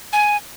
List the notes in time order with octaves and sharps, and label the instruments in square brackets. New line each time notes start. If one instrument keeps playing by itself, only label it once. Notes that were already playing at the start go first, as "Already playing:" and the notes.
[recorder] G#5